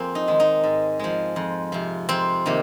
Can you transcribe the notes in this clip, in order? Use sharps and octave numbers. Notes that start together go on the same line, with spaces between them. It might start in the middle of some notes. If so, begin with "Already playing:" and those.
Already playing: F2 A#3 C4 G#4
D#4
D#3 G#3
D#4
G#2
F3 G#3
F2
C3 F3
F2 C4
C3 D#3 A#3